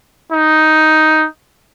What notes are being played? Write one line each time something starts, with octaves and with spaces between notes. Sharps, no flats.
D#4